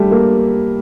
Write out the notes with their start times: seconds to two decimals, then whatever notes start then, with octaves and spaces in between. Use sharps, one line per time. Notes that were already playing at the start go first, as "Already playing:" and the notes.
Already playing: G3 A3
0.11 A#3